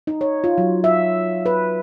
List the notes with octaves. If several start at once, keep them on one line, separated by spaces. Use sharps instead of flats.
D#4
C#5
F4
F#3
E5
B4